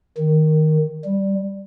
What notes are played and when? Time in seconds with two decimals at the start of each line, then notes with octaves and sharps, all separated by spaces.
0.17 D#3
1.04 G3